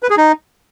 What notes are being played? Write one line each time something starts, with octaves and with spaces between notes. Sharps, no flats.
B4
G#4
D#4